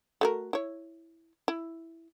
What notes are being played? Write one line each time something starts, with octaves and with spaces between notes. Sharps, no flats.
A3 F#4 A#4
E4 C#5
E4